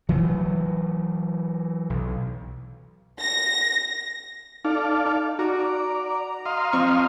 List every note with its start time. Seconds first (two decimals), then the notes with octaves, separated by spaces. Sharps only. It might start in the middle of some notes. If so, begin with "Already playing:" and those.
0.09 E3 F#3 A3
1.90 B1
3.20 A#6
4.64 D#4 A4 D5 F5
5.05 D#4
5.39 F#4 D5 A#5
6.46 D#5 F5 C6
6.73 F3 C4 C#6